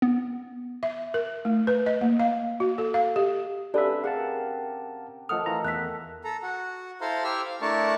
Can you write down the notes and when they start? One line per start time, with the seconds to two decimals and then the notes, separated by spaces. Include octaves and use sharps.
0.02 B3
0.83 E5
1.14 A#4
1.45 A3
1.67 B4
1.86 D#5
2.01 A#3
2.19 F5
2.60 F#4
2.78 A4
2.94 F5
3.16 G4
3.74 C#3 C4 D4 G4 A4 B4 D5 E5
4.04 G4 G#4 A#4 F5 F#5 A5
5.29 D#3 F3 A3 A4 F#5 D#6 F6
5.46 E3 F4 A#5
5.64 E2 E5 F#5 A5 F#6 B6
6.24 A4 A#5
6.43 F#4 F#5
7.01 E4 A4 C5 F5 A#5 C6
7.24 E4 G4 C5 E5 E6 F6
7.45 F5
7.61 A3 D4 E4 A#4 A5 C#6